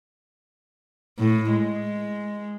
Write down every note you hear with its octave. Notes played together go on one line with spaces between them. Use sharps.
A2
G#3